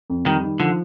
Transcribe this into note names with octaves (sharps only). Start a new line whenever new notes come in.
F2
D#3 G3
D#3
D3 F3